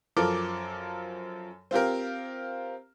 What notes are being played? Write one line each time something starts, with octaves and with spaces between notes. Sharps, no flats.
F#2 F3 A4 A#4 D6
C4 F4 G4 A#4